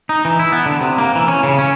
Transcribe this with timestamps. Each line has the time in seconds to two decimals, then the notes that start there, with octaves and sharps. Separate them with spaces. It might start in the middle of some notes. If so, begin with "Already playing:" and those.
0.09 D#4
0.25 E3
0.39 E4
0.52 B3
0.66 D3
0.81 C3
0.98 A#3
1.15 E3
1.28 C#4
1.43 C#3
1.59 C#4